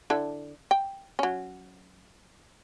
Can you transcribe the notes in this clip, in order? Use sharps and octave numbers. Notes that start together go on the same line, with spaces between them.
D3 E4 A4
G5
F#3 C#4